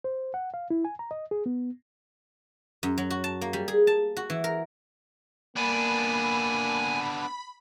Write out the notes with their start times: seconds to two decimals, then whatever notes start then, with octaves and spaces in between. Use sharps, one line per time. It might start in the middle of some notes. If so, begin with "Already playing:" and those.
0.04 C5
0.34 F#5
0.54 F5
0.70 E4
0.85 G#5
0.99 A#5
1.11 D#5
1.31 G#4
1.46 B3
2.83 F#2
2.98 F#3
3.10 F#4
3.24 A5
3.41 A#3
3.53 G3
3.68 G#4
3.87 A5
4.17 F#4
4.30 E3
4.44 A#4
5.57 A#3 B3 D4 G#5 B5